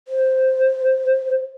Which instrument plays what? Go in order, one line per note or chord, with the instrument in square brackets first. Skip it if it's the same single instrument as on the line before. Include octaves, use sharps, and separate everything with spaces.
[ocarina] C5